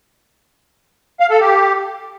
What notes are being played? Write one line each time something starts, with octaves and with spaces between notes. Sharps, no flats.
F5
A4
G4